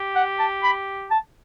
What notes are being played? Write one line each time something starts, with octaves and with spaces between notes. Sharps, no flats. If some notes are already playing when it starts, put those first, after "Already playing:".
Already playing: G4
F#5
A5
B5
A5